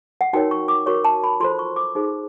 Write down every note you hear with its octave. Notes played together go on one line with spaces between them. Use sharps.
F#5
D#4 F#4 A#4 C#5 G5
C#6
D6
F#4 A#4 C#5 C#6
A5
B5
F4 A4 C5 C6
C#6
D6
D#4 G#4 C5